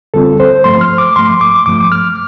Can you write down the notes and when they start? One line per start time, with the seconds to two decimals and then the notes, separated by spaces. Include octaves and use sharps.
0.14 D2 D3 G3 C4 F4 A4
0.40 C5
0.64 G2 F3 A3 C6
0.81 F6
0.98 D6
1.15 G2 F3 A3 C6
1.41 D6
1.66 G2 F3 A3 D6
1.92 F6